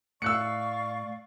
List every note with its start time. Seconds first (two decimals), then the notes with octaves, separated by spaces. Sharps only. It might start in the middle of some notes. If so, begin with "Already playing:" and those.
0.22 A2 D5 F5 C#6 E6 F#6 C#7